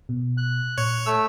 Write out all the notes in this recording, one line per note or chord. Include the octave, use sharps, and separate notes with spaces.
B2
F#6
A#2 C#5
A3 E6